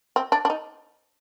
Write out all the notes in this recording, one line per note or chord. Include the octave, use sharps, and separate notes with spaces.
C4
D4
D4
D#4